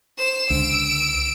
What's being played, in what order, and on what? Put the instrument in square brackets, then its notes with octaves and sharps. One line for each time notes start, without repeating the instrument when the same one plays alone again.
[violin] C5 E7
[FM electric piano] C#2 D3 [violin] E6 D7